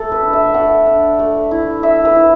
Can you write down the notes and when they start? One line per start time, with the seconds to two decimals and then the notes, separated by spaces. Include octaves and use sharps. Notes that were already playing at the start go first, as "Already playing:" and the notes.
Already playing: A3 A4
0.12 B4
0.22 D4
0.33 E5
0.54 A3 F#5
0.86 D4
1.19 A3
1.51 E4
1.83 A3 E5
2.05 B4
2.15 E4